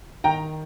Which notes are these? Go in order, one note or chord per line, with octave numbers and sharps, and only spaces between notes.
D#3 G5 A#5